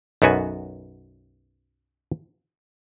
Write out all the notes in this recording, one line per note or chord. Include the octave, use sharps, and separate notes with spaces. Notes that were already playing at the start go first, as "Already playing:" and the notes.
B1 F#2 B3 F#4 G#5